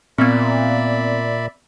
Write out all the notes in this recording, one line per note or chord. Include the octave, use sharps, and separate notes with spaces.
A#2 B3 C4 D5 E5 B5